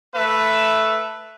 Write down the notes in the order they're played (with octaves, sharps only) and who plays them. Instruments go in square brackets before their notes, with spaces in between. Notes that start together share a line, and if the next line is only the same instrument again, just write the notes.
[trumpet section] A3 B4 E5